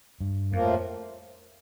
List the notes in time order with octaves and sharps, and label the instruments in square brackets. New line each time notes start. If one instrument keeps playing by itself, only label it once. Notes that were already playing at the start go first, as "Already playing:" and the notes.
[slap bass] G2
[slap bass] F2 [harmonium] A2 F3 A#3